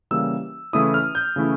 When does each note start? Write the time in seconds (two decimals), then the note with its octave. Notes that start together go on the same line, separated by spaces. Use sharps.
0.11 C#3 E3 G3 A#3 E6
0.73 C#3 E3 A3 C#4 E4 D#6
0.94 F6
1.15 G6
1.36 C#3 E3 A3 C#4 E4